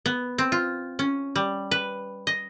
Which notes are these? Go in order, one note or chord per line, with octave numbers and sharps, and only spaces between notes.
B3
C4
F4
C#4
G3
B4
D#5